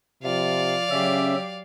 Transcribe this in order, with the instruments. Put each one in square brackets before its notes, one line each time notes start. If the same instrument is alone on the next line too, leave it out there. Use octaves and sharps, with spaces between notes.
[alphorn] C3 [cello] F3 F4 [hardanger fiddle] D5 F5
[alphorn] C#3 [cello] F#3 G4 [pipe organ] C#4 E5